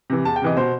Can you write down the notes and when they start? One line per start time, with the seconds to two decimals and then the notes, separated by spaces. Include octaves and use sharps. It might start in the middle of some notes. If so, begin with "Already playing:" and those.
0.10 C3 E3
0.25 E2 A5
0.36 G5
0.42 C3 E3 D#5
0.57 B2 C5